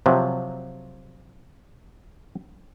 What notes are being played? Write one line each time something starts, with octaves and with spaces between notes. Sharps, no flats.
C3 F3 F#3